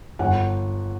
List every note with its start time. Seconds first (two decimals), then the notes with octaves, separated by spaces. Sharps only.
0.19 G1 F#5